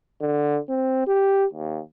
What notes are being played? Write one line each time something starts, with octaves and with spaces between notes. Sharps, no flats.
D3
C4
G4
D#2